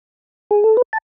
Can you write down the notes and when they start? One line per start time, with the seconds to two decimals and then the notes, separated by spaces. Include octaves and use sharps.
0.51 G#4
0.64 A4
0.77 B4
0.93 A5